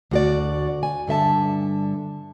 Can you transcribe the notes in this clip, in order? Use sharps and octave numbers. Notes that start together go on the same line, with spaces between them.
D2 F#4 D5
G#5
G2 D3 E5 A5